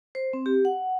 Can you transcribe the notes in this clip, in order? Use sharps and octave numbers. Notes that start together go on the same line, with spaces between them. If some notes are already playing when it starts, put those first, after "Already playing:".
C5
C4
G4
F#5